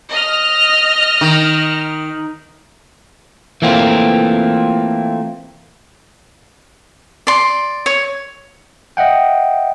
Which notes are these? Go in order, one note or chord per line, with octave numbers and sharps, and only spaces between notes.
D#5 F6
D#3
E3 A3 A#3 C4 F4
D5 C6
C#5
D#5 E5 F#5 G5